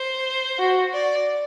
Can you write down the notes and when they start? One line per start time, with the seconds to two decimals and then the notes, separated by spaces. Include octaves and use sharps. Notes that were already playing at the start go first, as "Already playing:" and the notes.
Already playing: C5
0.59 F#4
0.93 D5